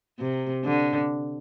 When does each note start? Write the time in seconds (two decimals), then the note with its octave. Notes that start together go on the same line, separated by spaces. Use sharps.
0.19 C3
0.65 D3